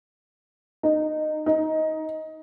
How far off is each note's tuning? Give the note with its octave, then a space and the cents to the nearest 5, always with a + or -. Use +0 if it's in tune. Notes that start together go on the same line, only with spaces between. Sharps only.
D#4 -15
D#4 +15